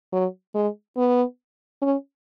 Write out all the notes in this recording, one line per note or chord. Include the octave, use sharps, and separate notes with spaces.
F#3
G#3
B3
C#4